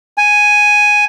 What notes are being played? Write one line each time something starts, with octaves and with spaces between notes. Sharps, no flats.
G#5